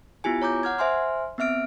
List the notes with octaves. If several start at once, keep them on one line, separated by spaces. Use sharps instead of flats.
B3 E4 F4 G4 G#5
C#5 A#5 D6 G6
F#5 F6 G#6
C5 E5 G#5 C6 F6
B3 C4 E5 F6 D7